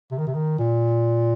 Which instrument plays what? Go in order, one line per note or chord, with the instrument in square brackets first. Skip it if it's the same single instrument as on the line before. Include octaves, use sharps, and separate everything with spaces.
[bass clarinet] C3
D#3
C3
D#3
A#2